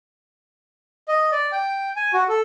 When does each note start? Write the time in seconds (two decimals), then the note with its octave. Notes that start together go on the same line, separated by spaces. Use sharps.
1.08 D#5
1.32 D5
1.52 G5
1.96 G#5
2.13 F#4
2.29 A4